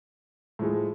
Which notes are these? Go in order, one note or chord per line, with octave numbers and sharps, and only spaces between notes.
A2 F3 G#3